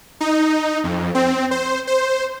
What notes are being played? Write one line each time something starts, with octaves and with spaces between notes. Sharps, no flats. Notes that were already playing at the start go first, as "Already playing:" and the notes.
D#4
F2
C4
C5
C5